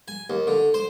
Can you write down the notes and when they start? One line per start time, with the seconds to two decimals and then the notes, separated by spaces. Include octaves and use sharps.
0.08 G#5
0.30 D#2
0.47 D3
0.74 C5